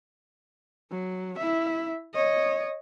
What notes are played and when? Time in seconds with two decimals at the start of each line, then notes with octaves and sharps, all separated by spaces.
0.91 F#3
1.38 E4 E5
2.14 C#5 D#5